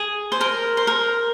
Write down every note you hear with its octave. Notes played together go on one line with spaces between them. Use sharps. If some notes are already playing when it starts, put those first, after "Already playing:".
Already playing: G#4
C5
A#4
C5
A#4